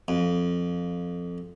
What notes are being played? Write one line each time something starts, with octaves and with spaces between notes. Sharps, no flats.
F2